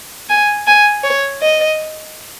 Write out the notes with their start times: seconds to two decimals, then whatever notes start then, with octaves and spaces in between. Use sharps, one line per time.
0.29 G#5
0.67 G#5
1.03 C#5
1.41 D#5